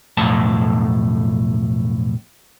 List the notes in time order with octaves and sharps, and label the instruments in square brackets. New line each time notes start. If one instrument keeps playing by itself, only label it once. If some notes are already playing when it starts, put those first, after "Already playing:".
[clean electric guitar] B1 F2 A2 A5